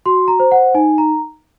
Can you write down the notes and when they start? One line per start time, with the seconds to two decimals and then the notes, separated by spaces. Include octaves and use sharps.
0.06 F#4 C6
0.28 A#5
0.39 C5
0.51 F#5
0.75 D#4 G#5
0.98 A#5